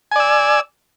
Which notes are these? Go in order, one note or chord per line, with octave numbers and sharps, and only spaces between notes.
D5 G#5 E6